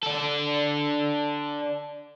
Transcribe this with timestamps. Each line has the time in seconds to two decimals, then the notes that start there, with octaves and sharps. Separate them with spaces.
0.03 D4 A4